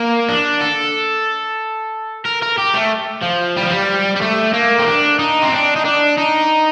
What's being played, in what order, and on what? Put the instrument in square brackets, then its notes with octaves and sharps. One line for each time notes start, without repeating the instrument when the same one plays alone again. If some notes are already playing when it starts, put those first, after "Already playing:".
Already playing: [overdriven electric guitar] A#3
D4
A4
A#4
A#4
G4
A3
F3
G3
F3
G3
G3
A3
A#3
C4
D4
D#4
C4
D4
D#4
D4
D#4